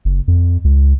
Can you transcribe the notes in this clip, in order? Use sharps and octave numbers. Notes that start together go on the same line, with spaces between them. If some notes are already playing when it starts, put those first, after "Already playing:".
F#1
F2
C#2